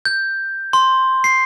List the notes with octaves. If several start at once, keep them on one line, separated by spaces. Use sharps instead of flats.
G6
C6
C7